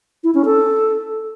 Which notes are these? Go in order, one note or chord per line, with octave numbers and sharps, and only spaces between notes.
E4
C#4
A4